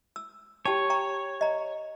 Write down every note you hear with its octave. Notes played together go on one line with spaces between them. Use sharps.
E6
G4 C#5 G5 A5
G5 A#5 C#6
D#5 A#5